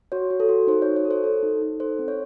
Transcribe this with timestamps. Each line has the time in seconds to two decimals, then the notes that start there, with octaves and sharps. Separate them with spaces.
0.12 F#4 C#5
0.30 F#4
0.40 A4
0.49 F#4
0.67 D#4 C5
0.82 C#5
0.86 F#4
0.96 C#5
1.05 A4
1.11 C5
1.24 A4
1.43 D#4
1.62 D#4
1.80 A4 C5
1.99 C4
2.08 C#5